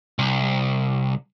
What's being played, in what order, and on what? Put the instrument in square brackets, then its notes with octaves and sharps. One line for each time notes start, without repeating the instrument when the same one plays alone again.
[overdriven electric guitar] C2